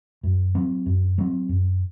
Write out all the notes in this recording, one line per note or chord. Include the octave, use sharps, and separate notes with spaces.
F#2
F#3 C4
F#2
F#3 C4
F#2